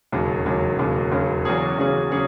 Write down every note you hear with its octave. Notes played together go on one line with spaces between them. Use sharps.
E1 D#2 C#3 F#3
E1 D#2 C#3 F#3
E1 D#2 C#3 F#3
E1 D#2 C#3 F#3
E2 C#3 F#3 C#4 G#4
E2 C#3 F#3 C#4 G#4
C#3 F#3 C#4 G#4